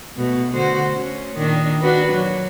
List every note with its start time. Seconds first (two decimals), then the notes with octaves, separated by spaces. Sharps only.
0.17 B2 A3
0.53 D3 F#4 C5
0.94 C#4
1.35 A#2 D#3 D4
1.81 D4 F#4 B4
2.13 F#3